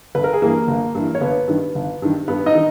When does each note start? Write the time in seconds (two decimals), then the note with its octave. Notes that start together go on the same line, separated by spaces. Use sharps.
0.15 G1 B4
0.24 A#4
0.33 G#4
0.42 G2 E3 A#3 A#4
0.67 G1
0.94 G2 E3
1.15 C#5
1.21 G1 B3 B4
1.48 G2 D#3
1.75 G1
2.02 G2 D#3
2.28 G2 B3 B4
2.46 D#4 D#5
2.55 D#3